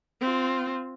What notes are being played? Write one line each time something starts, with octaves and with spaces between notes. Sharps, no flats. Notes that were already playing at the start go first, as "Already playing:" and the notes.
C4 F4